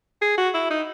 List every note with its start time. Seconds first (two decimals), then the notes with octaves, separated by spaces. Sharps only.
0.22 G#4
0.38 F#4
0.54 E4
0.71 D#4